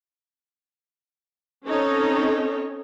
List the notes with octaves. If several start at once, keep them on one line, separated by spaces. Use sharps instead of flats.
C4 C#4 D#4 A4 C#5